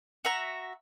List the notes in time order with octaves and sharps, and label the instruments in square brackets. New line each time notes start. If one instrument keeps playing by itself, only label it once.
[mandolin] F#4 E5 A#5